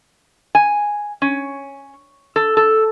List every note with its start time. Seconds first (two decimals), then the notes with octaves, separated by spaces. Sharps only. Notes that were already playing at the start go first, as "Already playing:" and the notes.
0.55 G#5
1.22 C#4
2.36 A4
2.57 A4